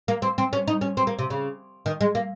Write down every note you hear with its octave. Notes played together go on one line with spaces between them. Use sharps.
A#3
C4
C4
C#4
D#4
C#4
C4
A#3
C3
C#3
D#3
G#3
A#3